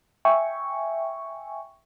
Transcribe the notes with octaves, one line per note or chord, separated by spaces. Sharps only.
E5 G5 G#5 C#6